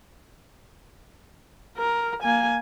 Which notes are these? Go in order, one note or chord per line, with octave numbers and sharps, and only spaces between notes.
A#4
A#3 G#5